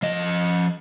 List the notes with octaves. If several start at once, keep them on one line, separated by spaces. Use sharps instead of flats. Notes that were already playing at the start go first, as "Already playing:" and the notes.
F3 D#5